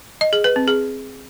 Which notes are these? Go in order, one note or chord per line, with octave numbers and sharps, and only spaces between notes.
D#5
G#4
B4
C4
G#4